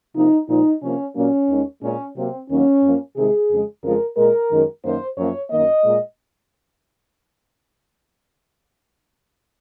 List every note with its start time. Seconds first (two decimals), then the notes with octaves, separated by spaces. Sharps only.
0.15 C3 F3 A#3 D#4
0.49 A#2 F3 G#3 D#4
0.82 C3 F3 A#3 C#4
1.16 A#2 F#3 A#3 C#4
1.49 D#2 D#3 G#3
1.83 A#2 G#3 C#4
2.16 C3 F#3 A#3 C4
2.50 D#2 D#3 F#3 A#3 C#4
2.84 F#2 F3 A#3
3.17 C3 D#3 G#3 G#4
3.50 F2 C#3 G#3
3.84 F2 C#3 F3 G#3 A#4
4.17 A#2 G#3 A#4
4.51 F#2 D#3 G#3
4.84 F#2 D#3 A#3 C5
5.18 F#2 F3 A#3 C#5
5.51 F#2 D#3 A#3 D#5
5.85 A#2 G#3